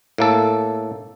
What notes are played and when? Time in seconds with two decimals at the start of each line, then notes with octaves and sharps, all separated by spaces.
0.18 A2 A#3 A4